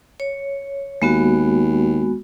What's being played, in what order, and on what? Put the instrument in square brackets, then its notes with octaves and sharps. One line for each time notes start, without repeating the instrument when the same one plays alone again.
[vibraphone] C#5
[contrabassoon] D#2 [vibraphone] G#3 B3 F#4